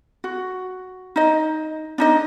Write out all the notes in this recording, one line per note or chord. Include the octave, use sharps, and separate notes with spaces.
F#4
D#4 D#5
D4 D#4 D#5